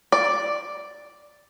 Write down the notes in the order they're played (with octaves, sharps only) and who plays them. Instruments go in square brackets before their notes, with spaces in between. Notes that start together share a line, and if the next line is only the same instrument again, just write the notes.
[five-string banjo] D5